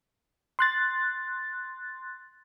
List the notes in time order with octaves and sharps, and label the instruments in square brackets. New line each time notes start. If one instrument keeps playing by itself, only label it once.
[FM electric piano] C6 F#6 A6